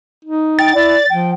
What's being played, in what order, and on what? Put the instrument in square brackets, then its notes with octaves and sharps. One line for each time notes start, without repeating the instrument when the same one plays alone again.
[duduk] D#4
[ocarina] G5 [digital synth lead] A6
[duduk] E4 [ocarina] D5
[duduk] F3 [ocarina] G5